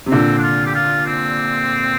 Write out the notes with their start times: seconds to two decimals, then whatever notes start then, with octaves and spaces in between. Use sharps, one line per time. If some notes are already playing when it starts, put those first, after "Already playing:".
0.06 C3
0.11 A#2 D3 C4
0.38 D4
0.43 F4
0.66 G4
0.75 F4
1.06 C4